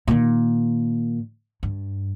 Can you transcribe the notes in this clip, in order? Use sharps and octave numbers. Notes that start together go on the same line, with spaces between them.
A#2 D#3
G2